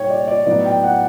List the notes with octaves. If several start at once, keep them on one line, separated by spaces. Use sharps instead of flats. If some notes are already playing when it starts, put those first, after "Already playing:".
Already playing: A#2 G3 A#3 D#4 C#5 G5
D5
D5
A2 F#3 B3 D#4 D5
G5
F#5